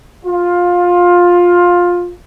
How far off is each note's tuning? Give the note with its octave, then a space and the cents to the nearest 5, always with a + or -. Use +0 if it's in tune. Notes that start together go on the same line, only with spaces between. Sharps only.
F4 +15